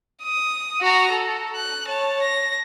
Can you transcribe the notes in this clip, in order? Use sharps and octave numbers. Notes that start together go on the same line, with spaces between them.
D#6
F#4 A#5
A4
F#6
C#5 A5
A#6